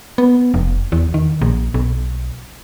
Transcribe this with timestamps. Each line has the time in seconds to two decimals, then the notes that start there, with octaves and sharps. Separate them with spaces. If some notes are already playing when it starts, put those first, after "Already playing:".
0.18 B3
0.54 F1
0.92 E2
1.14 D#3
1.41 A#1
1.74 B1